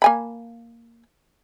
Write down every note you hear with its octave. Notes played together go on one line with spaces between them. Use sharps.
A#3 G#5 B5